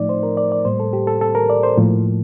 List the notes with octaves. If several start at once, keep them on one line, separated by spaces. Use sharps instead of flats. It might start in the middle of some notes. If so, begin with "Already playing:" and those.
Already playing: A2 F3 A3 D#4 D5
C5
A#4
D5
D5
A2 G3 A#3 C5
A4
G4
A4
A4
A#4
D5
C5
A2 F3 A#3